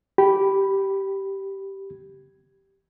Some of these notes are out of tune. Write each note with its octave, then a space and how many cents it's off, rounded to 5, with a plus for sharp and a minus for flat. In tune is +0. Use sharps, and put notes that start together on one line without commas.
G4 -10 B5 +0